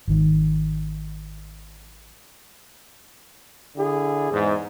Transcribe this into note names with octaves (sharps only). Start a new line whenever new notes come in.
G#1 D#3
D3 E4 G#4
E2 G#2